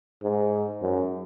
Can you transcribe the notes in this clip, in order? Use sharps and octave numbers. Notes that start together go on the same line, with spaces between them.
G#2
F#2